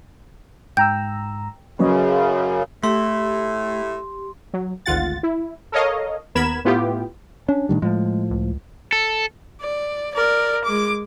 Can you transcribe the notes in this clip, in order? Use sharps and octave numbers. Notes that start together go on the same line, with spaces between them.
G#2 G5 A#5 E6 G6
F#2 C#3 F#3 C#4 B4 C#5 D#5
A2 A3 G4 E5 C6
F#3
G#1 D2 F4 F#5 A6
E4
A4 A#4 C#5 D#5 F5
D#2 B3 A#4 B5 G#6 E7
A2 B3 E4 F4 G4
C#4 D4
A2 D#3 G3
A2 F3 G#3
C#2
A4
D5
A#4 D5
G#3 D6